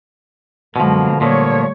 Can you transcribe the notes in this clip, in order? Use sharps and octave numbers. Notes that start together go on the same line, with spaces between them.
F#2 B2 D3 F3 G#3 A#3
A#2 F3 G3 A3 C#5